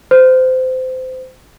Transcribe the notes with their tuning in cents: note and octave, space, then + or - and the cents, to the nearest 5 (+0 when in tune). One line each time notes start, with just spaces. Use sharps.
C5 -25